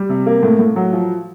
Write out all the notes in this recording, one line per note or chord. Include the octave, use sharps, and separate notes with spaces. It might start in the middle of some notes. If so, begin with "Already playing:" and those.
Already playing: G3
C3
A#3
A2
A2
F#3
F3